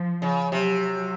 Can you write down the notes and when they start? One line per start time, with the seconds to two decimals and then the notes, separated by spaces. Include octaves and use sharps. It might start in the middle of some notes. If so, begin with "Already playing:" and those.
Already playing: F3
0.22 C#3
0.51 C3 F#3